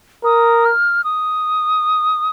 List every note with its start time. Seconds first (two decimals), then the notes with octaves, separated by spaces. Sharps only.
0.24 A#4 D#6
0.65 F6
1.04 D#6